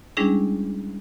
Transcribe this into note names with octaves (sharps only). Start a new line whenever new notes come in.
G3 G#3 C#4 D4 E4 G#4